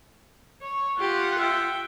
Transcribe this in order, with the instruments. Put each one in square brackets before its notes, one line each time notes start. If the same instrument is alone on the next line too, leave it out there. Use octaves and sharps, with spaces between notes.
[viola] C#5
[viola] F4 F#5 [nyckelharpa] G4
[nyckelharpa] E5 G5